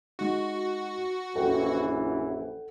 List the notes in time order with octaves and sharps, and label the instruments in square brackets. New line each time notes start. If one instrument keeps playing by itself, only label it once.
[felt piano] G#3 D#4 [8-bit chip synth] F#4
[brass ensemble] A#1 F#2 E3 [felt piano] A4 F#5 G5